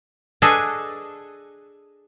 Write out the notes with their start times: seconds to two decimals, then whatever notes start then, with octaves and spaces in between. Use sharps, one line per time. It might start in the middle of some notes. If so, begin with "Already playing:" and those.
0.42 D4 G#4 A4 B4 D#5 G#5